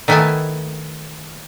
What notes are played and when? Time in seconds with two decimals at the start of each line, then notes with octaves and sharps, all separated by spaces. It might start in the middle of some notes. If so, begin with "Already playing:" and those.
0.08 D#3 A3 B3 E4 G#5 A5